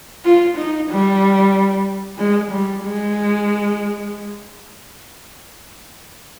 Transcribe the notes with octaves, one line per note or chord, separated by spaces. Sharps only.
F4
D#4
G3
G#3
G3
G#3